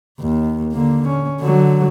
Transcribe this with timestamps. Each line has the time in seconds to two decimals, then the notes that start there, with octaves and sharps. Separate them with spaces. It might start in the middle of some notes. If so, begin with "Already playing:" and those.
0.20 D#2
0.72 D3 A#3
1.09 C#4
1.41 D3 F#3